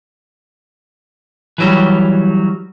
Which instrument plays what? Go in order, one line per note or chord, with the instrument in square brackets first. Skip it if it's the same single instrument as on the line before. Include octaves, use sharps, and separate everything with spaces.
[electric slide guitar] E3 F#3 G3